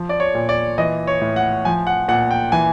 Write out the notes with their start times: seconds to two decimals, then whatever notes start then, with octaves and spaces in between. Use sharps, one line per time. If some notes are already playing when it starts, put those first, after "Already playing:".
Already playing: F3
0.09 D5
0.20 C#5
0.35 A#2
0.49 D5
0.78 E3 D#5
1.07 C#5
1.21 A2
1.36 F#5
1.65 F3 G#5
1.87 F#5
2.08 A#2 F#5
2.31 G5
2.52 E3 G#5